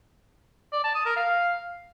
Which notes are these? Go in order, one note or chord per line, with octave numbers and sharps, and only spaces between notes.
D5
A5
D#6
A#4
F5